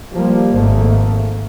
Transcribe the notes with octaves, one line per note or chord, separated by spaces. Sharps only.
F3 G3 A#3
G#1 G#2 F3 A3 A#3